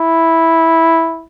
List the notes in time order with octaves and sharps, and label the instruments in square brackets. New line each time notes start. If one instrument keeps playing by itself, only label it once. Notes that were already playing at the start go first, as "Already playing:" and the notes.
Already playing: [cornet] E4